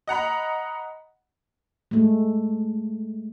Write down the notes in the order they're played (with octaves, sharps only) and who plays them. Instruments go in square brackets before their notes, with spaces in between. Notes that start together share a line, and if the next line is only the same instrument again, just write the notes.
[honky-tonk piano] D#5 F#5 A#5 B5
[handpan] G#3 A3